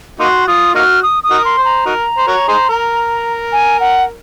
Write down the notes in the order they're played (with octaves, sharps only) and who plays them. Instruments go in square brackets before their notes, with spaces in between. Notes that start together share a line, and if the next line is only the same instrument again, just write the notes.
[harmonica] A#3 D#4 F#4 [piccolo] C6
[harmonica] F4 [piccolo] D#6
[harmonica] A#3 D#4 F#4 [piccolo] F6
[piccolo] D#6
D#6
[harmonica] D#4 F#4 A#4
[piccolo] C6
[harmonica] C5
[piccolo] A#5
[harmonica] D#4 F#4 A#4
C5
F#4 A#4 C#5
D#4 G#4 C5
A#4
[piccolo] G#5
F#5